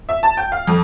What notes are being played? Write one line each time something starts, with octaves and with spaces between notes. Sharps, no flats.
E5
A5
G5
F5
F2